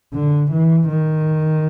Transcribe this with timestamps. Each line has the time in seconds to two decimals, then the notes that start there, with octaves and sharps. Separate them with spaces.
0.14 D3
0.51 E3
0.89 D#3